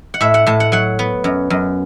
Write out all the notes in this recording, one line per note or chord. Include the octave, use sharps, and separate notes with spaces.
F#5
A2 E5
F#5
A2 A5
F#5
F#3 F#5
B3
F#2
F#2